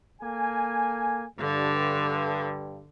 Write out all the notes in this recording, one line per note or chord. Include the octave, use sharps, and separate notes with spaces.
A#3 A4 G#5
G2 D3